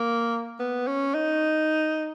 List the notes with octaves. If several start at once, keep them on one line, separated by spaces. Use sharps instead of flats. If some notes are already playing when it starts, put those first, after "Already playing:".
Already playing: A#3
B3
C#4
D#4